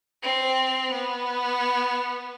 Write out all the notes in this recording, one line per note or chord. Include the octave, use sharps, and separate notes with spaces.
C4
B3